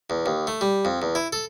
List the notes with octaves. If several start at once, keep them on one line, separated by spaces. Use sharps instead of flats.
E2
D#2
A3
G3
F2
E2
E4
A4